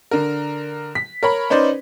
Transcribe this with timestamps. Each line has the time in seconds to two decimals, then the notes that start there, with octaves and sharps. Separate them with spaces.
0.11 D3 A#4
0.95 B6
1.23 A#4 C#5 B5
1.50 C#4 D#4 B4 C5 D5